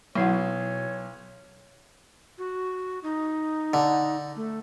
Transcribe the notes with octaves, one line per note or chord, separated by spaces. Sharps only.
B1 B2 F#3 E4 C#5 F#5
F#4
D#4
D3
A3